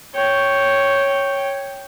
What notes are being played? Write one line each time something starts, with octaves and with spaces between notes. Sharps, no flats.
C#5 G5